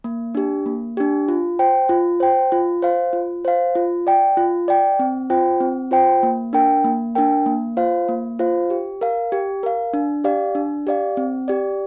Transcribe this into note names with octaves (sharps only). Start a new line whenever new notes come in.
A#3
D4 G4
A#3
D4 G4
F4
C5 G5
F4
C5 G5
F4
C5 F5
F4
C5 F5
F4
D5 G5
F4
D5 G5
C4
F4 C5 G5
C4
F4 C5 G5
A#3
D4 A#4 G5
A#3
D4 A#4 G5
A#3
F4 C5 F5
A#3
F4 C5 F5
G4
A#4 F5
G4
A#4 F5
D4
G4 D5 F5
D4
G4 D5 F5
C4
G4 D5